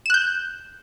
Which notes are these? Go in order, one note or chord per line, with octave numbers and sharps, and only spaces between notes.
F#6 G6 E7